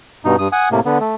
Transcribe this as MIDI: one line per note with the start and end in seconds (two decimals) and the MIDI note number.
0.25 0.36 43
0.25 0.36 47
0.25 0.36 63
0.39 0.48 43
0.39 0.48 87
0.52 0.69 78
0.52 0.69 80
0.52 0.69 87
0.71 0.80 45
0.71 0.80 48
0.71 0.80 58
0.85 0.98 50
0.85 0.98 59
1.00 1.15 57